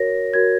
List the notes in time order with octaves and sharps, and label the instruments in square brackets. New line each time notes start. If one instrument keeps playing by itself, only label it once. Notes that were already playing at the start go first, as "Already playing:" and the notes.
Already playing: [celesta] F#4 A#4 C#5 A#6
F#4 A#4 C#5 G#6